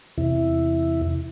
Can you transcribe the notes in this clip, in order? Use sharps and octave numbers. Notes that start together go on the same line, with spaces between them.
E2 C3 E4